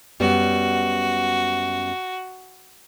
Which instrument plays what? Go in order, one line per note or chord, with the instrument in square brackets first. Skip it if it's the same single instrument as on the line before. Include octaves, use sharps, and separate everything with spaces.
[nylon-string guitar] F#2 G3 B3 [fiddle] F#4